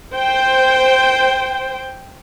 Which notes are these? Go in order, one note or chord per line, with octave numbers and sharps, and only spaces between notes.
C5 G5